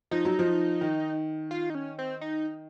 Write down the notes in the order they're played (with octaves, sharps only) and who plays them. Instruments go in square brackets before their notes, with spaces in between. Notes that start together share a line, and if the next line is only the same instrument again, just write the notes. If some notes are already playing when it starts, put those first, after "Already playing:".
[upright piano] F3 [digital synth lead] D#4
[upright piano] F#3
F3
D#3
[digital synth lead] F4
D#4
C#4
C4
D#4